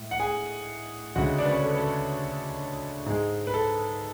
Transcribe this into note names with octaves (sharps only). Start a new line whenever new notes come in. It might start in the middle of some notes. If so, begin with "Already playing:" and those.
Already playing: A2 G#3
F#5
G#4 G#5
D2 C#3 G#3 F#4 F#5
D4 D5
B4
C#4 C#5
A4
B4
A4
G#2 G#3
B4
A4